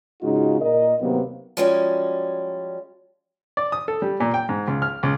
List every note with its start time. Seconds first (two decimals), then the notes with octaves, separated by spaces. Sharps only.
0.22 G#2 C#3 G#3 D#4 F4 F#4
0.61 A#2 A#4 D#5
1.00 D#2 C3 F#3 A#3 B3
1.57 F3 G3 G#3 C#4 F#4 D5
3.57 D5
3.72 D#6
3.88 A4
4.02 G3
4.20 A#2
4.34 G5
4.49 G#2
4.68 C#2
4.82 F6
5.03 C#2